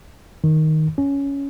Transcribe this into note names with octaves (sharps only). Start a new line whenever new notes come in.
D#3
C#4